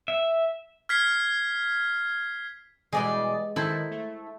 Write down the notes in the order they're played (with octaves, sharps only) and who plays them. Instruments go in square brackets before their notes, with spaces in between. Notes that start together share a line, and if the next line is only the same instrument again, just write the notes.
[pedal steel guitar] E5
[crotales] F6 G#6 B6 C7
[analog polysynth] B2 E3 G3 [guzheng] G#3 [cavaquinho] G#4 D5 D#5
[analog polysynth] D#3 [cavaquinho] E4 [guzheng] A4 C5
[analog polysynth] A3